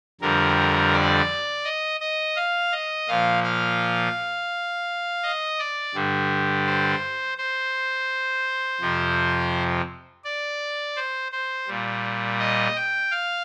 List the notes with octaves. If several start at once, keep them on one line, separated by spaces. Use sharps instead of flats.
F2 D3 G3 A#4
D5
D#5
D#5
F5
D#5
A#2 F3 F5
F5
D#5
D5
G2 D3 G3
C5
C5
F2 C3 F3
D5
C5
C5
A#2 G3
D#5
G5
F5